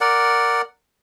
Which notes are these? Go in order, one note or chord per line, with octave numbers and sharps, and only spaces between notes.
A#4 D5 F#5